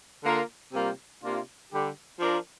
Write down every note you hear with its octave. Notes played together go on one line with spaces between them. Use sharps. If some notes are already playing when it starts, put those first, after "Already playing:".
D3 A#3 F4 A#4
C3 G3 A#3 F4 A#4
C3 A#3 D4 F4
D3 G3 D4 G4
F3 D4 F4 A#4